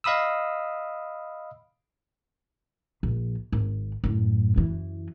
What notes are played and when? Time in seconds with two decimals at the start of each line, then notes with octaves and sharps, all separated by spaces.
0.04 D#5 F5 B5 D#6 E6
3.03 A#1
3.52 G#1
4.04 F#2 A2
4.56 F#2 E3